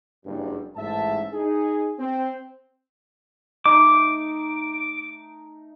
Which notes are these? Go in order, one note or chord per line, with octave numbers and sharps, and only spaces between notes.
F#1 G2
A1 G#2 E5 A5
D#4 G#4
C4
A3 D#4 D6